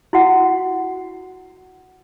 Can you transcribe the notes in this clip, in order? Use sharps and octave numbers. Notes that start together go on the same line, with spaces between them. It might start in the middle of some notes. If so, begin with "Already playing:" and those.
E4 F#4 F#5